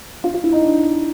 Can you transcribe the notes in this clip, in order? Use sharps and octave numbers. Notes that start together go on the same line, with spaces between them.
F4
F4
E4
D#4
D4